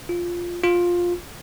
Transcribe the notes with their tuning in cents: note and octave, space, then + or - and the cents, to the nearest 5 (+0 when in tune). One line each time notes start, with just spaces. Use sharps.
F4 +0
F4 +10